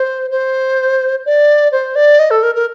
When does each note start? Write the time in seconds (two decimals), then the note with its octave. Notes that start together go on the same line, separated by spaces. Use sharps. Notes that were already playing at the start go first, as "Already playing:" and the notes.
Already playing: C5
0.31 C5
1.26 D5
1.72 C5
1.95 D5
2.19 D#5
2.31 A4
2.43 A#4
2.55 A#4